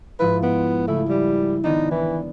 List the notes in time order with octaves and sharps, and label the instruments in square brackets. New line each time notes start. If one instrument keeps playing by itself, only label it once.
[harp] G#2 F3 E4 [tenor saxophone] B4
[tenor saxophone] B3 [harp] D7
[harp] C#3 E4 [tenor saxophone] A3
[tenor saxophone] G3
[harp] D#3 B3 D4 [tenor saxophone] D#4
[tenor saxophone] E3